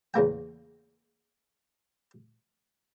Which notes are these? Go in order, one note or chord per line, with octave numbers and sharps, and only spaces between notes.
E2 C#3 A#3 G5